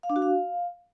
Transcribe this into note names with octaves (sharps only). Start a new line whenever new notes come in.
F5
D4
F#4
F5